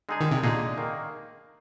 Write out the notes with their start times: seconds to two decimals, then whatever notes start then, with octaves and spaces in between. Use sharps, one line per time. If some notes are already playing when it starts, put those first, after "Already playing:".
0.09 D3 G#3 D#4 G#4
0.21 D#3
0.31 C3
0.43 A#2 D3 G#3 D#4 G#4
0.78 D#3 A#3